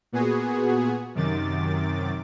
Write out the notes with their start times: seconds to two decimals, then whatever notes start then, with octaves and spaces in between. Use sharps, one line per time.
0.12 A#2 B3 F#4 G#4
1.15 F#2 C3 D#3 D6 A6